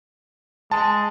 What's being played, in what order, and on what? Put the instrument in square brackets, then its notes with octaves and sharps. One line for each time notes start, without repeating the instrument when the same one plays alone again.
[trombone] G#3 [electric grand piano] A5